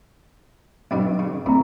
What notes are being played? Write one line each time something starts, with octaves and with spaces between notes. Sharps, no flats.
B1 G2 B2
C#3
G1 A2 C4 A#5